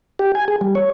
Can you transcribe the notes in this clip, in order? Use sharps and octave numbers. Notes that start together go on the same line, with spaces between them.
G4
G#5
G#4
G3
C#5